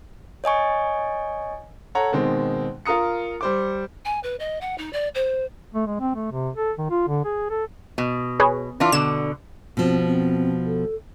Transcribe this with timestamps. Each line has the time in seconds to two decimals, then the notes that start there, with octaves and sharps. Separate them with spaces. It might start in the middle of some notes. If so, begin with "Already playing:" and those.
0.44 C#5 D#5 G#5 C#6
1.95 A4 C#5 F#5 A#5
2.12 B2 D#3 G#3 C4
2.86 F4 A#4 A#5 D#6 C#7
3.41 G3 C5 D6
4.05 G#5
4.23 B4
4.39 D#5
4.61 F#5
4.78 D#4
4.93 D5
5.15 C5
5.75 A3
5.87 G#3
6.00 C4
6.15 A3
6.32 C3
6.55 A4
6.78 D#3
6.90 F4
7.08 D3
7.25 G#4
7.50 A4
7.98 B2
8.40 G#4 B4 C#5
8.80 E3 D4 F4
8.92 B2 D3 E7
9.77 B2 F3 C4
10.05 C4
10.65 A4